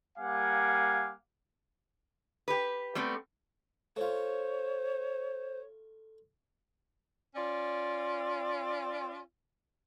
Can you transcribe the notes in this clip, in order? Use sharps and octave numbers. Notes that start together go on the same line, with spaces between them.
G3 A#3 F5 F#5 G#5 D6
G4 B4
G3 A3 B3 C4
A3 F4 C5 C#5
C#4 F4 D5